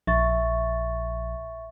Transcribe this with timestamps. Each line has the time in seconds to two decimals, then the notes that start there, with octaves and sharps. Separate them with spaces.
0.07 A#1 E5 C#6 A6